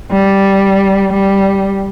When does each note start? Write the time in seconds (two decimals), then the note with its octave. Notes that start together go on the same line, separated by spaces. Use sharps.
0.11 G3
1.13 G3